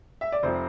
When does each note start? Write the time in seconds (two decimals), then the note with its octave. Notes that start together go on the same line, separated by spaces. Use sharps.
0.21 E5
0.32 D5
0.43 F1 C3 F3 C5